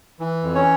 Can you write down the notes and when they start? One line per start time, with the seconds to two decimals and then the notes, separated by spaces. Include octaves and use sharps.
0.20 E3
0.43 F2
0.55 C#4 C#5